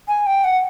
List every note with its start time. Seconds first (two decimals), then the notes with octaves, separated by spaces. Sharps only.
0.08 G#5
0.26 G5
0.44 F#5